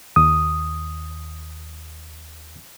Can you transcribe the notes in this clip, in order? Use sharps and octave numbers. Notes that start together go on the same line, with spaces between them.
D#2 D#6